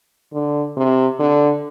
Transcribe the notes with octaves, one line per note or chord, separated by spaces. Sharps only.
D3
C3
D3